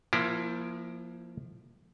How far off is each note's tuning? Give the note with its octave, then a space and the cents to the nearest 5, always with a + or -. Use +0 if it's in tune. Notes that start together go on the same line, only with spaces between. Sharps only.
F3 +0 A#3 +25 E4 +25